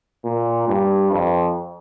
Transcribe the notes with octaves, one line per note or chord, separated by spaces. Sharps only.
A#2
G2
F2